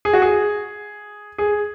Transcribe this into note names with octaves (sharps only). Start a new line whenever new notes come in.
G#4
F#4
G#4
G#4